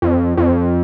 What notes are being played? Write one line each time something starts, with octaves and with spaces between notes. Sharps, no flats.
F2
F2